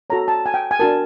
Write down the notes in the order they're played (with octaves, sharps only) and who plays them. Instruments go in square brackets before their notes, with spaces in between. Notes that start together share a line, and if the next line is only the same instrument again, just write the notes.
[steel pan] F#4 A4 C#5 A#5
A5
G#5
G5
G#5
D4 F#4 A#4 A5